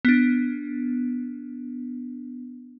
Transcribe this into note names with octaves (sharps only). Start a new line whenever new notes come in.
B3 D4